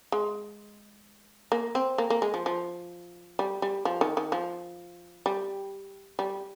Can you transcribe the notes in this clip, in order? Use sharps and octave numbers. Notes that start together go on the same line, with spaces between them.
G#3
A#3
C4
A#3
A#3
G#3
F3
F3
G3
G3
F3
D#3
D#3
F3
G3
G3